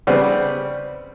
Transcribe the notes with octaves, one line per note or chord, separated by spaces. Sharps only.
C#3 G3 B3 C4